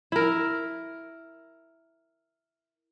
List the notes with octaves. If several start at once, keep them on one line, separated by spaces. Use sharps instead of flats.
E4 A#4